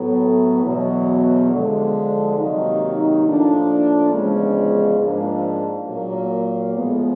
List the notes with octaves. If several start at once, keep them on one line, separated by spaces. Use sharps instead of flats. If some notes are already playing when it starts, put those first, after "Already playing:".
Already playing: A2 F#3 B3
E2 B2 F#3
D3 F3 G#3
C3 D#3 F#3 A#3 D#4
A2 F3 A#3 D4
E2 C#3 F3 G#3
G#2 F3 A#3 D4
A#2 F#3 A#3
A2 F3 G#3 B3